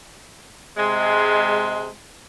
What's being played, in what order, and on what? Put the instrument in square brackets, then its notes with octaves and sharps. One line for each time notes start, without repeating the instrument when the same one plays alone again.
[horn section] C3 G#3